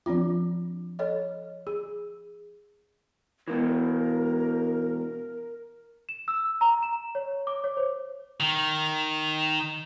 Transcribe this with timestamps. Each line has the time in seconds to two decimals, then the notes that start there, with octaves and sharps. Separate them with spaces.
0.06 F3 C4 D4 F4
0.99 A4 C#5 D#5
1.67 G#4
3.48 B2 E3 A#4
6.09 E7
6.28 E6
6.61 A#5
6.83 E7
7.15 C#5
7.47 D6
7.64 C#5
7.77 C5
8.40 D#3